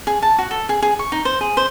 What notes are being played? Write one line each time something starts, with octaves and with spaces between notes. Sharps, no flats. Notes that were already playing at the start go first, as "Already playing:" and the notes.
G#4
A5
F#4
A4
G#4
G#4
C#6
D#4
C5
G#4
C5